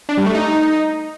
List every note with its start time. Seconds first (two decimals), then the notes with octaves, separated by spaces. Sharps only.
0.09 D4
0.17 G3
0.26 A3
0.35 D#4